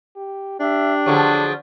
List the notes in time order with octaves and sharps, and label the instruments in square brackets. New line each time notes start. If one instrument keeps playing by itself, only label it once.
[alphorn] G4
[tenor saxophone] D4 [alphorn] G4 [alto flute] E5
[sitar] D3 F3 F#3 [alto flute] G#4